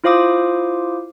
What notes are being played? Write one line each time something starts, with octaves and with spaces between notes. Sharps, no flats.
E4 F4 C5 F5 D6 D#6